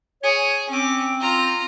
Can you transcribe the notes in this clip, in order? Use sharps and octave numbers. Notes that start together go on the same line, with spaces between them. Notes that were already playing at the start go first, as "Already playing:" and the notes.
G#4 C#5
C4 C#4 D6
F4 A#5